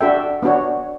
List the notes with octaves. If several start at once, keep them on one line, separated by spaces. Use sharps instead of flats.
D4 F#4 A4 E5 G5
B3 D4 F#4 C#5